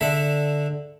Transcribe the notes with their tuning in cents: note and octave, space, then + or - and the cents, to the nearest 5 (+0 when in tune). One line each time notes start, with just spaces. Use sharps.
D3 +0 E5 +0